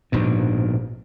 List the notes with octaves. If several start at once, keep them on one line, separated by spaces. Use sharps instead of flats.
A#1 G#2 B2